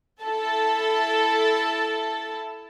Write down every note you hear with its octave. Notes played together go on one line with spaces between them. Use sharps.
E4 A4 A5